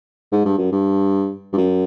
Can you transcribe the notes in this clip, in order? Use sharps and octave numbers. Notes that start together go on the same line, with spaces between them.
G#2
G2
F#2
G2
G2
F#2